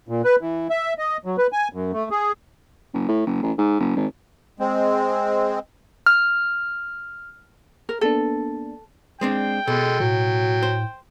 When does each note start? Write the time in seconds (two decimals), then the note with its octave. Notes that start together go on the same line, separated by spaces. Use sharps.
0.09 A#2
0.24 B4
0.41 E3
0.70 E5
0.98 D#5
1.25 F#3
1.38 B4
1.53 G#5
1.73 F#2
1.93 A3
2.11 G#4
2.93 F#1
3.08 A2
3.26 F#1
3.42 A1
3.58 G#2
3.80 F#1
3.96 G#1
4.60 G#3 C4
6.06 F6
7.89 A#4
8.01 A#3 B3 D4 A4
9.21 G#3 C4 D4 G5
9.67 B2 G#3 A4
10.00 A2 F#3
10.63 C5